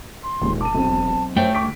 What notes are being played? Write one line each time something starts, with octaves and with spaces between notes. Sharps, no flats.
C6
E1 D#2 A#2 G#3
A5 D6 D#7
B1 C4
F#2 A3 C5 C#5 E5 G5
D2 C#6 D6 B6 D7